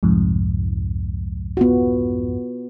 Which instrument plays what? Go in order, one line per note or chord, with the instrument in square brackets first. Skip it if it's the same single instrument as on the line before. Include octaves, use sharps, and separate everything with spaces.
[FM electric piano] C2 F2 G#2
[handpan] B3 F4 F#4